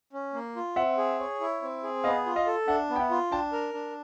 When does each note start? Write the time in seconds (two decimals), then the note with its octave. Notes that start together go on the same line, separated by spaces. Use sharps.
0.13 C#4
0.34 A#3
0.56 F4
0.76 C4 E5 F#5
0.98 G#4
1.19 C#5
1.40 E4
1.62 C4
1.83 G#4
2.04 B3 D#5 F5
2.26 F4
2.36 D#5 F5
2.47 A4
2.68 D4 E5 F#5
2.90 B3
2.96 G5
2.99 E5 F#5
3.10 F4
3.31 D4 G5 A5
3.53 A#4
3.74 D4